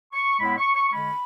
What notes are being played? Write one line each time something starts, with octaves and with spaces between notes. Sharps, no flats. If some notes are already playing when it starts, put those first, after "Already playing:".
C#6
A2 G#3 B3 E4 B5
C#6
C#6
C#6
D3 G#3 C#4 B5